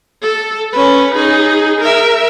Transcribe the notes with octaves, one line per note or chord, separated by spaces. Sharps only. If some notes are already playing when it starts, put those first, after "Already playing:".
A4
C#4 B4
D#4 G#4
A#4 E5